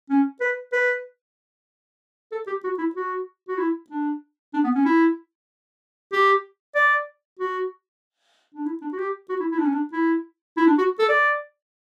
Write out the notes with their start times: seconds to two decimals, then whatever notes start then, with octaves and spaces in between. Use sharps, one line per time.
0.10 C#4
0.41 B4
0.73 B4
2.32 A4
2.47 G4
2.64 F#4
2.79 E4
2.95 F#4
3.48 F#4
3.58 E4
3.90 D4
4.54 D4
4.64 B3
4.75 C#4
4.85 E4
6.13 G4
6.75 D5
7.40 F#4
8.54 D4
8.66 E4
8.82 D4
8.93 F#4
8.98 G4
9.29 F#4
9.40 E4
9.51 E4
9.58 D4
9.65 C#4
9.73 D4
9.93 E4
10.57 E4
10.67 D4
10.78 F#4
10.99 A4
11.09 D5